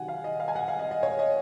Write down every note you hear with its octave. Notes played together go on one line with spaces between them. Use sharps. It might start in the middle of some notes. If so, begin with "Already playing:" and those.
Already playing: C3 D#3 F#3 F#5 G#5
F5
D#5
F5
G#5
F#5
F5
D#5
D#5
C#5
D#5